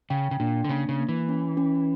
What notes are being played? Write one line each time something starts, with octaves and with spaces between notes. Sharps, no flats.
C#3 G5
C#3
A#2 D4
D3
C#3 A#3
C#3
A#3
E3
C#4
C#4